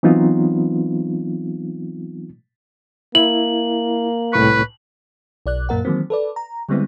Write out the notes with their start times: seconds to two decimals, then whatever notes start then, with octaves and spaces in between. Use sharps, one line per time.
0.03 E3 F#3 B3 C4 D#4 F4
3.15 A#3 E4 F#7
4.33 C2 A2 B4 C#6
5.46 B1 D5 F#6
5.69 F#2 A#2 A#3 A#4 F#5
5.85 D#3 E3 F#3 A#3 C4
6.10 A4 B4 D5
6.36 A#5
6.69 D3 G3 G#3 B3 C4 E4